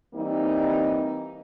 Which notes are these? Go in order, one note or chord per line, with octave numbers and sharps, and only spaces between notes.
E3 G3 A#3 C4 D#4